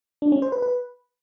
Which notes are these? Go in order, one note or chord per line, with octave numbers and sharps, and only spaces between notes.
D4
C#4
C5
B4
B4